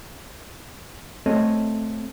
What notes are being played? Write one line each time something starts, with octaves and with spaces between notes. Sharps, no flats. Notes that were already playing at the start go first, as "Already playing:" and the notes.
A3 C4 A4 C#5 D#5